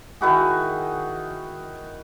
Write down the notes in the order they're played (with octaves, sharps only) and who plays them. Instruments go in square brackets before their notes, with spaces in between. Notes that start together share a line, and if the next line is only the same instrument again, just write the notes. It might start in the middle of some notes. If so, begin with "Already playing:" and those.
[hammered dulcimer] D#3 E4 F#4 G#4